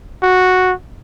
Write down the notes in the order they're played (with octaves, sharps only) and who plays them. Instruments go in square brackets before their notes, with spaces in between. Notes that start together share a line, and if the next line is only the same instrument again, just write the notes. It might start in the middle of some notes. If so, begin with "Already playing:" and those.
[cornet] F#4